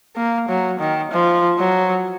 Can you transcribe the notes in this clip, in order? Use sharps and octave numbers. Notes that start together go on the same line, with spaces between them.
A#3
F#3
D#3
F3
F#3